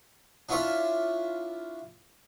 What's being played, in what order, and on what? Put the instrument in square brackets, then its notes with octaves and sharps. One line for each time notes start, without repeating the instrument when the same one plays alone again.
[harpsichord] D4 E4 F4 C#5 D5 E5